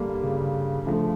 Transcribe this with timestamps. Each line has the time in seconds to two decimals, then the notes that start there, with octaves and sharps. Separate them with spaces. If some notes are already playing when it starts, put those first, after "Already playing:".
Already playing: G2 D3 G3 A#3
0.23 C#3
0.86 D3 F3 A3